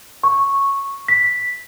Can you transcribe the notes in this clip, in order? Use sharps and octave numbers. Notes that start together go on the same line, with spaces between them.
C#6
B6